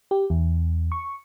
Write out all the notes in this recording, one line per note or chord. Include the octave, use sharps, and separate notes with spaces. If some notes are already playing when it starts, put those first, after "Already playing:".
G4
E2
C#6